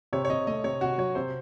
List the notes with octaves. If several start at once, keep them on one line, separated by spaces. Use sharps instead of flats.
C3 C#5
C#5
C3 D#5
A3 D#5
C3 C#5
C3 F#4
F#3 C#5
C3 C5